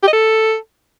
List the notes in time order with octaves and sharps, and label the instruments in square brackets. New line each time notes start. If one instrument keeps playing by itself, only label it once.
[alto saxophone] G4
D#5
A4